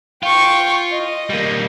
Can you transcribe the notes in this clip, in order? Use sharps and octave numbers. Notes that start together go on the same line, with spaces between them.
F4 G5 C#6
D#5
G3 A#3